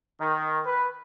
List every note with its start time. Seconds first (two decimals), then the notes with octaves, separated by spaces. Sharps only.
0.20 D#3
0.66 B4